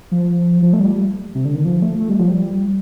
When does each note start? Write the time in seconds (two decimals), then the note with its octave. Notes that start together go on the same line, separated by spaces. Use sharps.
0.11 F3
0.62 F3
0.73 A3
0.80 G3
1.35 C3
1.45 D3
1.55 D#3
1.65 F3
1.82 A3
2.00 A3
2.10 G3
2.19 F3
2.29 G3